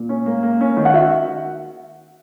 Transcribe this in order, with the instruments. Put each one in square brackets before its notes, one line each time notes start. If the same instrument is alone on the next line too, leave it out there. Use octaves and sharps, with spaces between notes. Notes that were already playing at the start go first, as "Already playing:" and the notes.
Already playing: [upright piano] A#2
C#4
A#3
A#3
C#4
D#3
[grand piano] F#5
[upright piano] F#4 [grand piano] E5